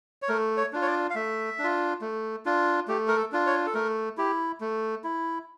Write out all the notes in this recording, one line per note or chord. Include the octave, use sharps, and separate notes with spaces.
C#5
A3 A#4
C#5
D4 F4
C#5
D5
F5
A3 E5
D4
F4
A3
D4 F4
A3 G4
A#4
A4
D4 F4
C#5
A4
A3 A#4
E4 G4
A3
E4